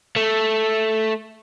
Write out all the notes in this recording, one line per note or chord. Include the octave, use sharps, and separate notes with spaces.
A3